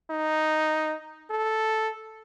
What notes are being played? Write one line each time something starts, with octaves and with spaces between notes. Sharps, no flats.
D#4
A4